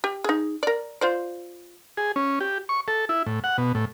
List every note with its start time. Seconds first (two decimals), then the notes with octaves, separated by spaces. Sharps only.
0.04 G4
0.24 D#4 G#4
0.63 A#4 D5
1.01 F4 C5 D5
1.97 G#4
2.16 C#4
2.41 G4
2.69 C#6
2.88 A4
3.09 E4
3.26 A2
3.44 F#5
3.58 B2
3.75 A2